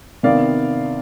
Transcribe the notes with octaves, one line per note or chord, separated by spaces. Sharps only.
C3 D#3 B3 D5 F5